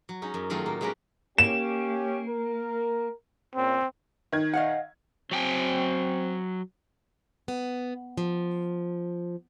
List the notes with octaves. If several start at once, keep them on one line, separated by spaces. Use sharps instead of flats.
F#3
G#3 C#4 D#4
F#2
D#3 F#3 A3 F4 G#4
A2 A#3
G#3 B3 C#4 F#4 G4 A#4
A#3 C#4 G4 E7
A#4
A#2 C#3 C4
D#3 G#6
D#5 F5 F#5
F#3 C4 G5 G#5
B3
F3